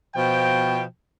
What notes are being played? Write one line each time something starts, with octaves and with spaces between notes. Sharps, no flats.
B2 F3 G5